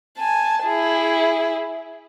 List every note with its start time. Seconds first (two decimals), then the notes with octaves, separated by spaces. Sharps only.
0.18 G#5 A5
0.63 E4 G#4